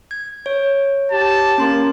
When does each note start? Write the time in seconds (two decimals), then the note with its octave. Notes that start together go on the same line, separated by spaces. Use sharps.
0.11 G#6
0.46 C#5
1.11 G4 A5
1.58 A#3 C#4 C6